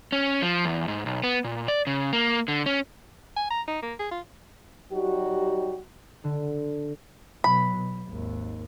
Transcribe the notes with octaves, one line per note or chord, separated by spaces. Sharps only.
C#4
F3
E2
G#2
B1
B3
A#2
D5
C#3
A#3
D3
C#4
G#5
A#5
D#4
A#3
G#4
F4
F#3 G3 D#4 F#4 G4
D3
B2 F#3 B5
B2
G#1 D#2